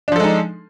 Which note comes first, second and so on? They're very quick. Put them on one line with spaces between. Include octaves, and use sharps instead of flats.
D4 F3 A4 G#3 D#4